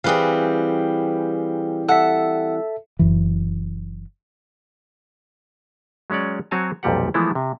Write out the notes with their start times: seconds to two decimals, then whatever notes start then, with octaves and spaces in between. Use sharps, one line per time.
0.04 E3 G3 C4 G#4 B4 F5
1.89 A4 E5 F#5
2.99 F#1 F#2 E3
6.10 F#3 G#3 C#4 C#5 D5
6.51 F#3 C4 F#4 C#5 G#5 A5
6.83 B1 F2 A#2 G3 G4 F#5
7.14 E3 F3 G#3 A3 B3 E4
7.35 C3